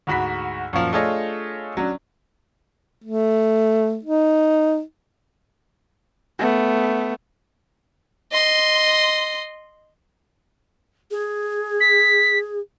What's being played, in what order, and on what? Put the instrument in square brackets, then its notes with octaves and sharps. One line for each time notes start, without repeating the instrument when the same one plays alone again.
[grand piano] D2 G#2 F#4 B5 B6
F#2 A#2 F3
A3 D4 F4 G#4 C#5 D#5
F#3 C#4 D4
[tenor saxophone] A3
D#4
[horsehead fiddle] A3 B3
[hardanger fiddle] D#5 C6
[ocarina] G#4
[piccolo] B6